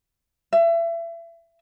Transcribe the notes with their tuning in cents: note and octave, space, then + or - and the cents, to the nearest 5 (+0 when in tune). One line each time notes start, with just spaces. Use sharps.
E5 +30